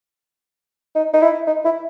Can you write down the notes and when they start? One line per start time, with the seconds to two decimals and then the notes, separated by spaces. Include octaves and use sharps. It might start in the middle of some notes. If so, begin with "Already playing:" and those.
0.95 D#4
1.14 D#4
1.22 E4
1.47 D#4
1.65 E4